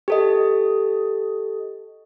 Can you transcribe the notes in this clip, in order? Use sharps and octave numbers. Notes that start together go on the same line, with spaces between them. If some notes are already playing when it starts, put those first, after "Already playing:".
G4 A4 D#5